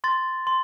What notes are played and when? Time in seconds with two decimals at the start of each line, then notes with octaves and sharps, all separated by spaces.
0.04 C6 A6
0.47 C6